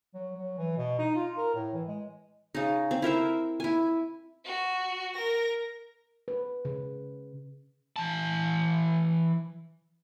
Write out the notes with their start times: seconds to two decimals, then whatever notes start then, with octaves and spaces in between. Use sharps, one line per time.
0.14 F#3
0.37 F#3
0.58 E3
0.77 B2
0.99 D#4
1.16 F4
1.38 A#4
1.55 A2
1.74 E3
1.88 G#3
2.55 C#3 D#4
2.91 C4
3.02 E4 A#4 C5 E5
3.60 E4 G#5
4.44 F#4
5.14 A#4 A#6
6.28 B4
6.65 C#3
7.96 E3 A5